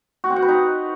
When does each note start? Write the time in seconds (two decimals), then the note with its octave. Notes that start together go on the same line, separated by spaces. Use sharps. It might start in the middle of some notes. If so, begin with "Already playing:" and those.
0.24 F#4
0.30 C4
0.36 F#5
0.42 B4
0.49 D#4